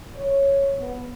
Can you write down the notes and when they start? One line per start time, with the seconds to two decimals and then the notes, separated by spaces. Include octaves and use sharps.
0.16 C#5
0.78 B3